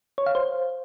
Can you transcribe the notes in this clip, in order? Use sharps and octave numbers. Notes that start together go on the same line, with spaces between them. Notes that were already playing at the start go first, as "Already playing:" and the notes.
C#5
F5
C5